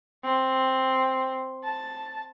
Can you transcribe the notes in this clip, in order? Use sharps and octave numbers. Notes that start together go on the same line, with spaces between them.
C4
A5